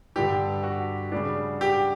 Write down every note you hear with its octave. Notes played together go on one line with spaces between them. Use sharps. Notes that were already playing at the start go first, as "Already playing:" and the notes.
G2 D3 G3 D4 G4
F#4
C#3 G3 D4
G4